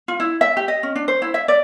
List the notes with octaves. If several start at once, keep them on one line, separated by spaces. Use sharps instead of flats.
F4
E4
E5
G4
D#5
C#4
D4
C5
E4
E5
D5